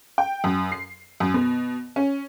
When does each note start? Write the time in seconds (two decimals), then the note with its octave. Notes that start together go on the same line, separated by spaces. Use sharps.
0.18 G5
0.44 F#2
0.72 C7
1.20 F#2
1.34 B2
1.96 C#4